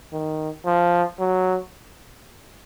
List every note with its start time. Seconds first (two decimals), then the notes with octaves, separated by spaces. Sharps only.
0.13 D#3
0.66 F3
1.19 F#3